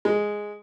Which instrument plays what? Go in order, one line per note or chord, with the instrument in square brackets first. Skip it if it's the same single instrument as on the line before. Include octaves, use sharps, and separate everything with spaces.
[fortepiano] G#3